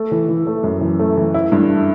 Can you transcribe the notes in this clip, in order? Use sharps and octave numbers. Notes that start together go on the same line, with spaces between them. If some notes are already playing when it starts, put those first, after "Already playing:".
Already playing: A3
E3
E3
A3
F#2
E3
A3
E3
E4
G2